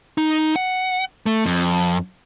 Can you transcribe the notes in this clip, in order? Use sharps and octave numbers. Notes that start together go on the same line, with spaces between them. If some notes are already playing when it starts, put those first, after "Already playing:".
D#4
F#5
A3
F2